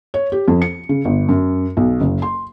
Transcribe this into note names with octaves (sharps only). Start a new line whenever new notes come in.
C#5
G4
F2
C#7
C#3
G1
F#2
B1
F#1
C6